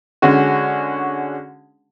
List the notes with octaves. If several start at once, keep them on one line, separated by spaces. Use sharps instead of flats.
D3 G#3 C#4 F#4